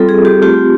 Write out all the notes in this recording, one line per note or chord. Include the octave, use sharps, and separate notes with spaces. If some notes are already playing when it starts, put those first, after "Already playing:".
Already playing: G3 C4 F4 A4
G#4
G4
A3 C4 F4 G4